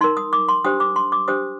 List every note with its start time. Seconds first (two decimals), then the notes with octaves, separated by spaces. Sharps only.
0.01 D#4 A#4 C6
0.17 D#6
0.33 D6
0.48 C6
0.64 D4 G4 C5 D#6
0.80 D6
0.96 C6
1.12 D6
1.28 D4 G4 C5 D#6